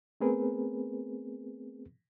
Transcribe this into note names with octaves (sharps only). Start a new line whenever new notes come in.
A3 B3 C4 G#4 A#4 B4